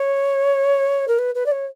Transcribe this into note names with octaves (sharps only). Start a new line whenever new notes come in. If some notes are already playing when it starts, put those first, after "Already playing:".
Already playing: C#5
A#4
B4
B4
D5
C#5